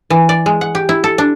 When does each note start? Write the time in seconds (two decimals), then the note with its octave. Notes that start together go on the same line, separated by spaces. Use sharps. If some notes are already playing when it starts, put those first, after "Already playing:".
0.10 E3
0.29 D5
0.46 G#3
0.61 F#5
0.75 G4
0.89 E4
1.04 A4
1.18 D4